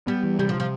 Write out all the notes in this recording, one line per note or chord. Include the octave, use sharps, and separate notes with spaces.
G3 B3
E3
C3 G3
F3
C3
F3